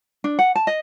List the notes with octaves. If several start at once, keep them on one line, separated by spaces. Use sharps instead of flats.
D4
F#5
A5
D#5